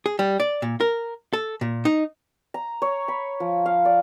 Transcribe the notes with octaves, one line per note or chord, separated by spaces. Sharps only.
G#4
G3
D5
A#2
A#4
A4
A#2
D#4
A#5
C#5
B5
F3
F5
D5